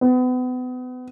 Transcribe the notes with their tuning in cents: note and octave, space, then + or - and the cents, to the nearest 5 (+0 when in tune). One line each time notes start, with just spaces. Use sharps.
B3 +35